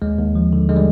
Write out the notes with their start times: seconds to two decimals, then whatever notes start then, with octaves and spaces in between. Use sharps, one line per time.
0.02 D#2 G#3
0.19 D#2
0.35 F3
0.53 D3
0.69 D3 G#3
0.76 G3